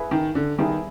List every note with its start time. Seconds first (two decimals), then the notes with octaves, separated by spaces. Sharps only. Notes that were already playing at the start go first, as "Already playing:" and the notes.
Already playing: E4 G#4 B4
0.11 D#3
0.35 D3
0.58 D#3 G3 B3 E4 G#4 B4